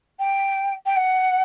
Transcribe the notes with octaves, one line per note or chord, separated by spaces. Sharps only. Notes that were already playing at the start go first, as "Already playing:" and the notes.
G5
G5
F#5